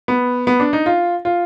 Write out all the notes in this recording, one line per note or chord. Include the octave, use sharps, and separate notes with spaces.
B3
B3
D4
D#4
F4
F4